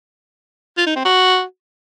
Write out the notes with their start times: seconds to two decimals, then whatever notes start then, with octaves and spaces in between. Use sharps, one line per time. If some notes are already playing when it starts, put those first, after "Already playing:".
0.77 F4
0.87 D#4
0.96 C4
1.05 F#4